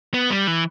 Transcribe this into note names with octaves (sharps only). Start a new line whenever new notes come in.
B3
G3
E3